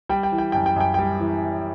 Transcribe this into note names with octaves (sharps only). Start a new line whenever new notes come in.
G3 G5
G5
E3
G5
F#2 G5
G5
F#2 G5
G3 G5
E3